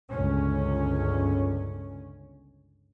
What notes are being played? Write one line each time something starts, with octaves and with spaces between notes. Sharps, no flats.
G1 C#2 C#4